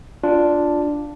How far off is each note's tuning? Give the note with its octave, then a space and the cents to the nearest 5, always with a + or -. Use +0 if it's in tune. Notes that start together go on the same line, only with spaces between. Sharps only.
D4 +0 F4 +0